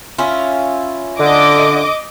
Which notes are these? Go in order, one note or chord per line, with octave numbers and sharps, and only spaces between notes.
C#4 E4 F4
D3 D#5 D6